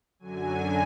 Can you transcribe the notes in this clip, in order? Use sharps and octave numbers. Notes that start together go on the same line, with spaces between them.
F#2 D3 F#3 G#5